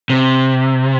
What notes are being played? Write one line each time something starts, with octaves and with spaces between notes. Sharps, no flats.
C3